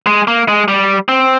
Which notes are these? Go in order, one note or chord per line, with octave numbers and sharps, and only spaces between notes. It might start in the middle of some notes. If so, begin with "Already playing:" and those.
G#3
A#3
G#3
G3
C4